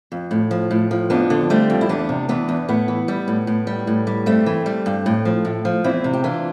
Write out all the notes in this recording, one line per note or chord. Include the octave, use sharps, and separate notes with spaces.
F2
A2
F3
A2
F3
F2 B3 D4
D3
G3 A3 C4
F2
E4
E2 B3 D4
C3
E3 B3 D4
E2
A2 B3
E3
G3
A2
A2
G3
A2
G3
G2 A3 C4
E3
G3
G2
A2
F3
A2
F3
E2 C4 E4
C3
G4
E3 D4 F4